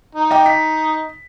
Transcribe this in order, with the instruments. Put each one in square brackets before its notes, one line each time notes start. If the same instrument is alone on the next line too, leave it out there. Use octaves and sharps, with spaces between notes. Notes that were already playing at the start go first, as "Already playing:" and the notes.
[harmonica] D#4
[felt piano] D#5 G5 D6
B6